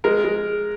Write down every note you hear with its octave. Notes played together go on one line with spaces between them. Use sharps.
G#3 A#4
G#3